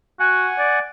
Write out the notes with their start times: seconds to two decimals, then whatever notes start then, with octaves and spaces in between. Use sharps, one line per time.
0.20 F#4 F#5 G#5
0.59 D5